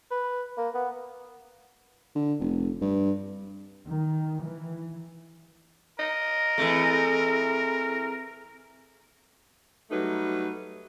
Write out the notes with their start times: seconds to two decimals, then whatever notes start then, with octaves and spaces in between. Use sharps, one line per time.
0.11 B4
0.58 A#3
0.75 B3
2.15 D3
2.40 F1
2.81 G2
3.86 D#3
4.40 E3
5.99 A#4 D#5
6.58 E3 A3 C4 G#4 A4
9.90 F#3 G3 A3 D#4 B4